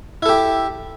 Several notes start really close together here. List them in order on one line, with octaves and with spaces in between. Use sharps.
E4 A4 G4